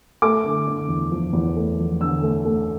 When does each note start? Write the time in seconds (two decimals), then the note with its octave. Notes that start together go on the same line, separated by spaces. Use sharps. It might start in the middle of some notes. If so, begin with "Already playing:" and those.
0.22 A3 D6
0.44 D3
0.67 D3
0.89 E2
1.11 F3
1.33 E2
1.56 A3
1.78 F3
2.00 D3 E6
2.22 A3
2.45 A3